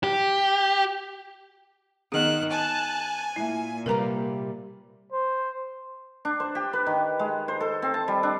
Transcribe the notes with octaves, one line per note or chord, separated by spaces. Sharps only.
G4
D#3 B3 G#4 F#6
G#5 A5 F#6
A#2 E4 E5
C3 G3 A#3 A#4 B4 A#5
C5
D4
C5
G4
B4
D#3
G#3
C5
A4
C4
A5
G3
D4